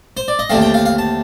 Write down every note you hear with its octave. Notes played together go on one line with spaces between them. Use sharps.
C5
D5
D#5
D#2 D3 A3 C4 F5
G5
F5
F5
A5